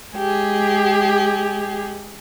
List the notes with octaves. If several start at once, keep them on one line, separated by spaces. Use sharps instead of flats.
G#3 G4 G#4